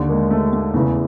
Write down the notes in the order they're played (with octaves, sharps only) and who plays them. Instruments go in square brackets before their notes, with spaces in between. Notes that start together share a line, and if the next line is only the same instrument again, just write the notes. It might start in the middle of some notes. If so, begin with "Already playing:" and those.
Already playing: [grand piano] D#2 D3
G#3 A#3
A3
A3
E2 C#3 E3 A3